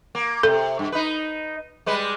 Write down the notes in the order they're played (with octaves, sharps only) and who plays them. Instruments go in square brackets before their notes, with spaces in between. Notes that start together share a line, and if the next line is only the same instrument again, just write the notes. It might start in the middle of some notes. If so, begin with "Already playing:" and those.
[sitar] A#3
[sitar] C3 [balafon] A4
[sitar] G2
D#4 B4
G3 G#3 B4